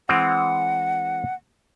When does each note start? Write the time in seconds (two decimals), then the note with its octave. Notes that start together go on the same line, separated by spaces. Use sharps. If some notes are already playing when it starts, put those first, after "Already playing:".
0.09 E3 G#3 C4 F#5